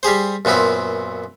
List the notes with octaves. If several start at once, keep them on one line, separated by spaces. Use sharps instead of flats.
G3 G4 G#4 C5
F#2 A#2 B3 C4 E4